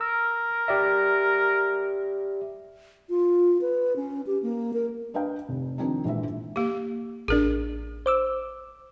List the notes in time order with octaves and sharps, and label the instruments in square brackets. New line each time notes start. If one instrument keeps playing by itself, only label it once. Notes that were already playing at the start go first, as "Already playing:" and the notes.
[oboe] A#4 [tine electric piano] E6
[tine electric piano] G4 D5 E5
[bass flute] F4
B4
C#4
G4
A#3
A#4
[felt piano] D4 B4 D#5 F5 G5
F1
D#3 F3 C4 D4 D#4
A#1 G#2 E3 G#3 E5
[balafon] A#3 G4
[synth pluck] A1 D4 [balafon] G#4 A#4
[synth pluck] C5 D6 E6